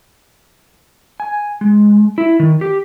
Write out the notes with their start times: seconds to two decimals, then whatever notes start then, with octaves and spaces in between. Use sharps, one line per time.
1.20 G#5
1.61 G#3
2.18 E4
2.40 D#3
2.61 G4